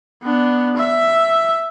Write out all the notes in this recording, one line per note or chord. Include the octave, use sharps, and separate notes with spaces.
B3 D4
E5